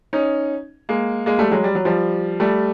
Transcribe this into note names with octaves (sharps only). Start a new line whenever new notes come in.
C#4 D#4
G#3 A#3
G#3 A#3
G3 A3
F#3 G#3
G3
F#3
F3 G3
G3 A3